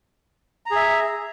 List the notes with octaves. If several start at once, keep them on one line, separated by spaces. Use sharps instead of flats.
G#4 E5 A#5